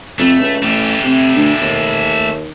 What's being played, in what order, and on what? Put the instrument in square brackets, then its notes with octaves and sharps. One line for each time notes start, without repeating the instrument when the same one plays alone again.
[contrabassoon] F2 [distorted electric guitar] A3
[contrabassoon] C#2
[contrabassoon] A1 [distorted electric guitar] A3 G4
[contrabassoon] C3
D2
D#2